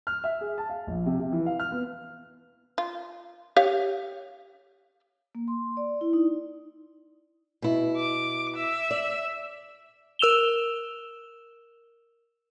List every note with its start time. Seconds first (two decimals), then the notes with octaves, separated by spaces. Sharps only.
0.07 F6
0.24 E5
0.41 G#4
0.58 A5
0.70 F5
0.87 A#1
1.06 C3
1.19 C3
1.32 E3
1.46 F5
1.59 F6
1.72 B3
2.78 F4
3.56 G4 C#5 F5
5.35 A#3
5.48 C6
5.77 D5
6.01 E4
6.13 D#4
7.62 B2 E4
7.98 D6
8.57 E5
8.91 D5
10.19 A#4 E6 E7 F7 G7